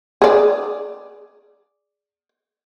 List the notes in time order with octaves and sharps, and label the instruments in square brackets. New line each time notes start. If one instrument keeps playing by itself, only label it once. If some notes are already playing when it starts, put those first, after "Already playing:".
[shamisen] G#4 D5